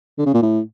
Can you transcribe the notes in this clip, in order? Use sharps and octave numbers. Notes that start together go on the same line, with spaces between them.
D3
C#3
A#2
A2